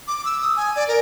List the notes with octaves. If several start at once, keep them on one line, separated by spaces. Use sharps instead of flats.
D6
E6
D#6
G#5
D5
A#4